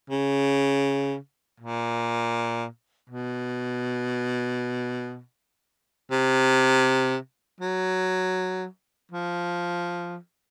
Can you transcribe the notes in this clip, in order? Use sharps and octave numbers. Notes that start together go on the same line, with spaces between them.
C#3
A#2
B2
C3
F#3
F3